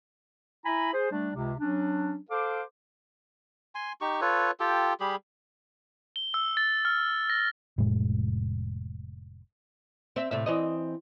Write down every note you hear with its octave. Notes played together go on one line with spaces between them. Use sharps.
E4 G#5 A#5 B5
G#4 C5
G3 A3 D4
C#2 C3
F#3 C#4 D4
A4 C5 F5 D6
G#5 C6
D#4 G4 C#6
F4 A4 B4 C#5
F4 G4 A4 G5
G3 G4 G#4 B5
G7
E6
A6
F6
A#6
F1 A2 G#3
C4 E5
A2 C3 E5
E3 C4 D#5